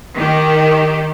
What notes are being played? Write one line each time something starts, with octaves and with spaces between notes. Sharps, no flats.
D#3 G4